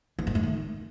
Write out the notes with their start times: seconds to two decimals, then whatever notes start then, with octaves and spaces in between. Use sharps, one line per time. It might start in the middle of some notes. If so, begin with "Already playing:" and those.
0.18 E3
0.27 G2
0.35 A3
0.43 D#3